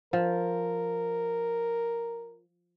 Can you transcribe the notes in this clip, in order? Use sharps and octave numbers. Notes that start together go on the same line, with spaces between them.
F3 A#4